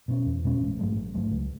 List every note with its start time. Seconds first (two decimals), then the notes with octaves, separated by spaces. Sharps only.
0.08 B2 G#3 C#4
0.26 E2
0.44 B2 G#3 C#4
0.61 A1
0.79 G#2 F#3 A3
0.96 A1
1.15 G#2 F#3 A3
1.31 C#2